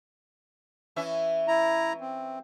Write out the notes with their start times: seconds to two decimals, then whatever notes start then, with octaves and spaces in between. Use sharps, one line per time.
0.96 E3 C#4 E5
1.48 E4 A#5
2.01 C4